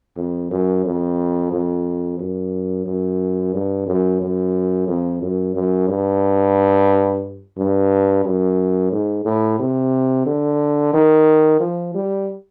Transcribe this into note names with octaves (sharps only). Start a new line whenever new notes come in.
F2
F#2
F2
F2
F#2
F#2
G2
F#2
F#2
F2
F#2
F#2
G2
G2
F#2
G#2
A2
C3
D3
D#3
F3
G3